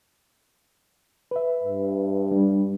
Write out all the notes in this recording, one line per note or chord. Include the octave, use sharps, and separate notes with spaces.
B4 E5
G2
G3 D4